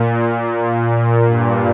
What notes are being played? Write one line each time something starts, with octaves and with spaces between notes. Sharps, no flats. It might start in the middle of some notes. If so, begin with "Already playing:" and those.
Already playing: A#2
A#2
G2